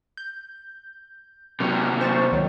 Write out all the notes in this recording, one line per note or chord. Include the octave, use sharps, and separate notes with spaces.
G6
C3 F#3
C5 C#6 A6
C#2 D#3 F#3